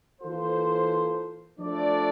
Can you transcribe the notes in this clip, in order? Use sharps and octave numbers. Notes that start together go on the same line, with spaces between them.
E3 A#3 F4 A4 C5
F3 A3 D4 A4 D5